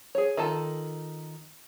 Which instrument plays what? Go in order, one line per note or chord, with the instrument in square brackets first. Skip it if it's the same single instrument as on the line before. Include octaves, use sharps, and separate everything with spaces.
[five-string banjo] G#4 C#5
D#3 F4 A4 A5